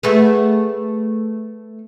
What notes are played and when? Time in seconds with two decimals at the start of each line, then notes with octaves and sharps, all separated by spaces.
0.03 A3 B3 G#4